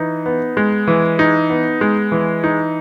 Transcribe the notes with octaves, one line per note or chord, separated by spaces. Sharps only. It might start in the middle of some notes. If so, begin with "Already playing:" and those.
Already playing: E3 D#4
B3
G#3
E3
D#4
B3
G#3
E3
D#4